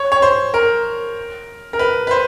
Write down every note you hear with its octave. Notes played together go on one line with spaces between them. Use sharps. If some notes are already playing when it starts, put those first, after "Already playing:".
Already playing: C#5
C#5
C5
A#4
A#4
B4
B4
C5